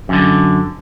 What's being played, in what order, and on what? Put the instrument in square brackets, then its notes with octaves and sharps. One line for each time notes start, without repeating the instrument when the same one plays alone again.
[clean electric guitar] F#2 D3